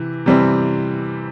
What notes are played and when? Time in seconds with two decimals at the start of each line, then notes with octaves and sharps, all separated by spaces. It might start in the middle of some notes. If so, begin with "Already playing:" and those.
Already playing: C3 E3
0.26 C3 E3 G3 C4